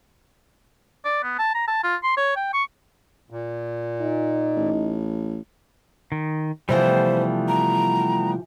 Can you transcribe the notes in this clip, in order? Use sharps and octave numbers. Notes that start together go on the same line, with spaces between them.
D5
B3
A5
A#5
A5
F4
C6
C#5
G5
C#6
A#2
D#4
A1
D#3
C3 E3 F3 G3 A3 B3 C5
A#5